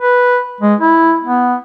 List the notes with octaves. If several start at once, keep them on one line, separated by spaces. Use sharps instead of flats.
B4
G#3
E4
B3